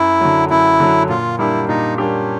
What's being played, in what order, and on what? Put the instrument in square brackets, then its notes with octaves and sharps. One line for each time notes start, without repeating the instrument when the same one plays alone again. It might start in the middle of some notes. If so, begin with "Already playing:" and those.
Already playing: [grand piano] F#2 [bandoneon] E4
[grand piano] D3 F#3
[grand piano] F#2 [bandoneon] E4
[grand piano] D3 F#3
[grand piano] A#2 [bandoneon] F4
[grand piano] G3 A#3 D4 G4 [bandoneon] E4
[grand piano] A#2 [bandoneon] D#4
[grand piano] G3 A#3 D4 G4 [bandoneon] C#4